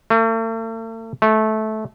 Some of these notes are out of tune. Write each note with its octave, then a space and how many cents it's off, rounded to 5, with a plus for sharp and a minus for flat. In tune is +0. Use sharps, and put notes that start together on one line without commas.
A3 +45
A3 -15